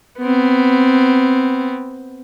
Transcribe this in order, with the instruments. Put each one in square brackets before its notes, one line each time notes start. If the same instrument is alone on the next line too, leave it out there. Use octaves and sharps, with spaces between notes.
[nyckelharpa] B3 C4